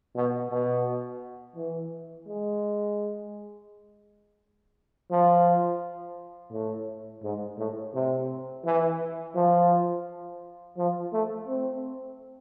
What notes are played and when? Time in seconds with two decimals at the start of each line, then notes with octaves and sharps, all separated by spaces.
0.15 B2
0.50 B2
1.56 E3
2.27 G#3
5.11 F3
6.52 A2
7.23 G#2
7.58 A2
7.94 C3
8.65 E3
9.35 F3
10.77 F3
11.13 A3
11.48 C4